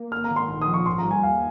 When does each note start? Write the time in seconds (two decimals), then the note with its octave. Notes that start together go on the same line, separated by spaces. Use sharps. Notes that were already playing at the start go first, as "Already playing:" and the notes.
Already playing: A#3
0.11 G#1 F6
0.24 A#5
0.31 D#3
0.36 C6
0.49 A#1
0.61 D#6
0.67 F3
0.74 C#6
0.86 G#1 C6
0.98 A#5
1.04 G3
1.11 G#5
1.23 D#2 F5